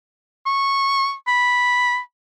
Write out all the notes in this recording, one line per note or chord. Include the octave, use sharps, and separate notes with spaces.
C#6
B5